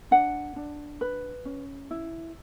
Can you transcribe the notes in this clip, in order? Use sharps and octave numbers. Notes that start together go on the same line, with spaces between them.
D4 F#5
D4
B4
C#4
E4